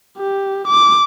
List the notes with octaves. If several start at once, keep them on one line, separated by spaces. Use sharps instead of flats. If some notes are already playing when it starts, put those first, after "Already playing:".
G4
D6